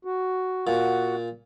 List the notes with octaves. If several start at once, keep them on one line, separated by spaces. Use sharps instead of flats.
F#4
A#2 F#4 F#5